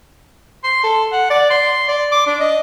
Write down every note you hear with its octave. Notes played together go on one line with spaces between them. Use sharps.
C6
A4
F#5
D5
C6
D5
D6
D4
D#5